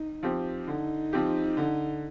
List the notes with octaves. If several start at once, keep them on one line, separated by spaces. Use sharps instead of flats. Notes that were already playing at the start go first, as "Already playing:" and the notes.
Already playing: D#4
F3 C4 G4
D3 D#4
F3 C4 G4
D3